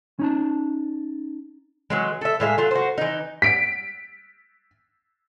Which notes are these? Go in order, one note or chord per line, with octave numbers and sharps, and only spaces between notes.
C#4 D#4 A5
E3 F#3 G#3
A4 E5
A2 G#3 E5 F5
F#3 F4
F#4 C5
E3 D#4
B6 D7